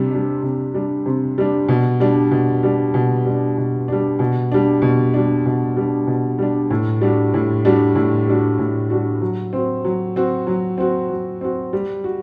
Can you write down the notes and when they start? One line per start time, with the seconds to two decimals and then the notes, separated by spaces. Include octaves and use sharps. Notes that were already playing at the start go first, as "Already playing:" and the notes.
Already playing: C3 G3 D4
0.11 G3 D4
0.43 C3
0.74 G3 D4
1.06 C3
1.38 G3 D4
1.69 B2
2.00 G3 D4
2.31 B2
2.63 G3 D4
2.94 B2
3.25 G3 D4
3.57 B2
3.88 G3 D4
4.19 B2
4.52 G3 D4
4.82 B2
5.14 G3 D4
5.46 B2
5.77 G3 D4
6.07 B2
6.39 G3 D4
6.71 A2
7.01 G3 D4 F#4
7.34 A2
7.65 G3 D4 F#4
7.95 A2
8.28 G3 D4 F#4
8.59 A2
8.90 G3 D4 F#4
9.21 F#3
9.53 C4 F#4
9.85 F#3
10.16 C4 F#4
10.47 F#3
10.78 C4 F#4
11.09 F#3
11.41 C4 F#4
11.73 G3
12.04 F#4